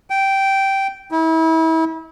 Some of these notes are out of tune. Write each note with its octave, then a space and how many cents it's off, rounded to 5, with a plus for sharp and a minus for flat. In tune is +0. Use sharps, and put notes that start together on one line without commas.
G5 -10
E4 -35